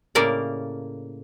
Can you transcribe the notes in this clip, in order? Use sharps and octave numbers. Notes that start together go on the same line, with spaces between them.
A2 C#3 A#3 A#4 D5